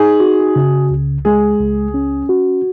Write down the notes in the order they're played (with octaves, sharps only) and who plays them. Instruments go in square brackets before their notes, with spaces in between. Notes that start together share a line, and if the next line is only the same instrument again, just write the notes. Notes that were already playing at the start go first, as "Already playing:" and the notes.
Already playing: [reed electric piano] D#4 [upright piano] G#4
[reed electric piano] F#4
C#3
C#2
[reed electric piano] G#3 [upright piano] G#4
[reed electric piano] C#2
C#4
F#4